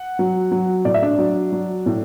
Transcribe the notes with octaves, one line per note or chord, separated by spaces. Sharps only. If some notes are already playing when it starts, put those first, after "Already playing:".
Already playing: F#5
F#3
F#3
A2 D5
E5
D4 D5
F#3
F#3
A2